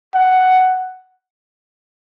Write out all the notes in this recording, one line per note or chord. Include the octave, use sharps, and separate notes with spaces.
F#5